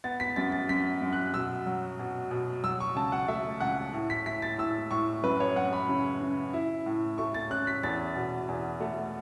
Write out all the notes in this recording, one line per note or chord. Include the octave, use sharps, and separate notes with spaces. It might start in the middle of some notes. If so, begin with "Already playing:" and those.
B3 A6
B6
F#2 A6
A6
F#2 B6
F#2
F#6
B2 E6
F#3
B2
B2
F#3 E6
C#6
C#2 A5
F#5
A3 E5
C#2 F#5
A2
B6
E4 B6
A6
A2 E6
A2 C#6
F#2 B4
C#5
F#2 F#5
B5
C#3
C#3
E4
A2
A3 C#6
A6
C#4 F#6
B6
E2 A6
B2
E2
A3